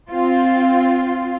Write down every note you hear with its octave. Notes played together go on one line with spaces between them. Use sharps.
C4 F4